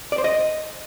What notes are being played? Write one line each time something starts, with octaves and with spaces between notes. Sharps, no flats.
D5
C5
D#5